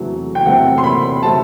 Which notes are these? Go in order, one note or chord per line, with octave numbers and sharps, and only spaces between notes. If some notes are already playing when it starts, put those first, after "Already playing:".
Already playing: E2 C3 F#3 A3
G5
E2 C3 F#3 A3 F#5
C6
B5
C3 F#3 A3 A5